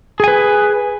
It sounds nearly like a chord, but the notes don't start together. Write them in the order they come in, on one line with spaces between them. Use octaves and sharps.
G#4 G#5 B4